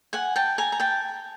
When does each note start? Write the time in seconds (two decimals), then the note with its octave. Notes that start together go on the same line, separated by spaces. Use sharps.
0.13 F#5 G#5
0.36 G5 A5
0.58 G#5 A#5
0.72 A#5
0.80 G5 A5